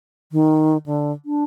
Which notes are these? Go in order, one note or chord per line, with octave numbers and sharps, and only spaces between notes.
D#3
D3
D4